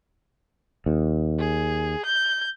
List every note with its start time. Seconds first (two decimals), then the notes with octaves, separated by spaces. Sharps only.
0.86 D#2
1.39 G#4
2.05 G6